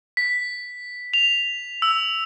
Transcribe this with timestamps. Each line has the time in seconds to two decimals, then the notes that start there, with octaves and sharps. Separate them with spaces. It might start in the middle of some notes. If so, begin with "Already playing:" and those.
0.17 B6
1.14 F7
1.82 E6